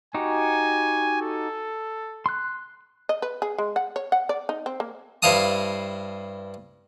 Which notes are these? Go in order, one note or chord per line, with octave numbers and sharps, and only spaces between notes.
D#4 F#4 G4 G#5
A4
C6 F#6
D#5
B4
G#4
G#3
F#5
C#5
F#5
D5
D#4
C4
A#3
G2 E4 C5 F5 A5 D#6